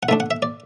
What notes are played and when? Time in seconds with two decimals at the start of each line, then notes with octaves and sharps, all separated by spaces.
0.03 F#5
0.09 D3 A3 D4 E5
0.20 F#5
0.31 E5
0.42 D5